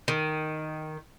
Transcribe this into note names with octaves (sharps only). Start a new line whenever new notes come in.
D#3